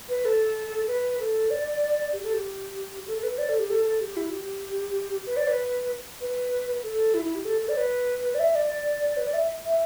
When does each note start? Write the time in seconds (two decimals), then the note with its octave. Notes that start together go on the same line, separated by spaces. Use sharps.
0.09 B4
0.25 A4
0.87 B4
1.20 A4
1.50 D5
2.13 G4
2.24 A4
2.34 G4
3.07 A4
3.17 A4
3.23 B4
3.38 D5
3.49 A4
3.59 G4
3.70 A4
3.85 A4
4.01 G4
4.17 E4
4.32 G4
5.26 B4
5.37 D5
5.48 B4
6.21 B4
6.83 A4
7.14 E4
7.25 E4
7.35 G4
7.45 A4
7.61 A4
7.69 D5
7.77 B4
8.35 D5
8.40 E5
8.55 D5
9.17 B4
9.25 D5
9.34 E5
9.66 E5